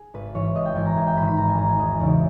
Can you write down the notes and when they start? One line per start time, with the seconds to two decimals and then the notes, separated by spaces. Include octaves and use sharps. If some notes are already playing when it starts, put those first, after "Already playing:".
Already playing: G#4
0.14 G#1 B4
0.34 G#2 E3 C#5
0.55 G#1 D#5
0.66 G5
0.75 G#2 E3 G#5
0.86 A#5
0.96 G#1 G#5
1.07 G5
1.17 G#2 D#3 B5
1.28 B5
1.37 G#1 A#5
1.48 G#5
1.58 G#2 D#3 A#5
1.68 G#5
1.79 E1 D#5
1.99 E2 C#3 E3